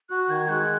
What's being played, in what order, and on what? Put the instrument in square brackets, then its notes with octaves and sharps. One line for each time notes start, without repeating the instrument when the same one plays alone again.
[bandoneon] F#4 [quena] F#6
[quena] F#6
[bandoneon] D#3 [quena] G#6
[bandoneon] G#3 [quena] F#6